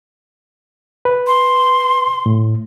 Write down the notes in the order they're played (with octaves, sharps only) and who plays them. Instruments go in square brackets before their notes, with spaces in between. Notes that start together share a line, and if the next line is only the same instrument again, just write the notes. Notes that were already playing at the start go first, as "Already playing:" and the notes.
[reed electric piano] B4
[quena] C6
[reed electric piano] A2